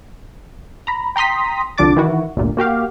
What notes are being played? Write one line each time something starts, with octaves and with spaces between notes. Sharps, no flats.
A#5 B5
G5 A#5 C6 D#6 B6
C2 D3 F3 D4 D6 A6
D#3 E3 E4 F#4
G1 D2 A#2
A#3 F#4 G4 F5